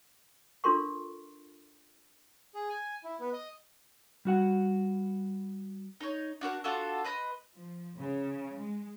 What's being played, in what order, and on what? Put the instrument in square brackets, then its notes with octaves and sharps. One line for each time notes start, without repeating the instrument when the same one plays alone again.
[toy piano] D4 F4 A4 A#4 C6 C#6
[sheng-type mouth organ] G#4
G#5
E4
B3
D#5
[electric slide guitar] G3 F#4 F#5
[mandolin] D#4 C#5
D4 F#4 A#4 F#5
D4 F4 F#4 A4
B4 D#5 A#5 C6
[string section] F3
C#3
G#3